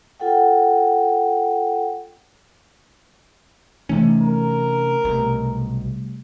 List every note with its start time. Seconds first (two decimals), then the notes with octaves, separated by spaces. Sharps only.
0.20 F4 A4 F#5 G5
3.89 C3 E3 A3 C#4 D#4
4.22 A#4
5.05 B1 C3 G3 A3